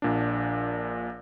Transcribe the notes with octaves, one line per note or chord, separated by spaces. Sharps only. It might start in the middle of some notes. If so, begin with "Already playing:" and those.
A#1 A#2 D4